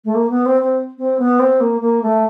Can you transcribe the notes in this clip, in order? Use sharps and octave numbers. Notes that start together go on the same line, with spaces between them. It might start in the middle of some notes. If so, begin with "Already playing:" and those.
A3
A#3
B3
C4
C4
C4
B3
C4
A#3
A#3
A3